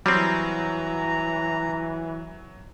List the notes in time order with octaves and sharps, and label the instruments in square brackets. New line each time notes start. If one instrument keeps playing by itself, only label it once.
[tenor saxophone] E3 [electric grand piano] F#3 [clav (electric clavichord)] G3 C4 [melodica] A#5